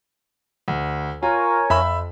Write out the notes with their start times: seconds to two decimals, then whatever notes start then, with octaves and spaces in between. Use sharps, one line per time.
0.68 D2
1.23 F4 A#4 C#5 G#5
1.70 F2 E5 B5 E6